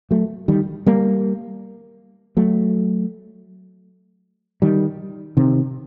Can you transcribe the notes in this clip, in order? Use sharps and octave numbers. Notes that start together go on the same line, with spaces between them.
F#3 A3
D#3 G3
G3 A#3
F#3 A3
D#3 G3
C3 D#3